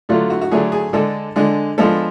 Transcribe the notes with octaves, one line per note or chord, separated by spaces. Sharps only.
D3 F#3 A3 D4 F4
F#4
F#4
D3 F#3 A3 D4 G#4
G#4
D3 G#3 D4 A4
D3 G#3 D4
F3 G#3 B3 D4 A4